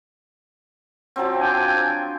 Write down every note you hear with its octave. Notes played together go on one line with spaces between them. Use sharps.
F3 F#3 C4
D4 G5 G#5